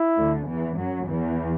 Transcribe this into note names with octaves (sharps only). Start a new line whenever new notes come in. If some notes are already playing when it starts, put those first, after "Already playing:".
Already playing: E4
D2 D3
E2 E3
F#2 F#3
E2 E3